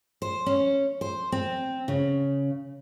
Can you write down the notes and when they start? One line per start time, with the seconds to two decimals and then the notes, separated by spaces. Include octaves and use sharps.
0.22 C5
0.46 C#4
1.01 C5
1.32 C4
1.88 C#3